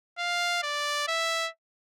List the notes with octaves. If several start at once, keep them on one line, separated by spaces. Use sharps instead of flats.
F5
D5
E5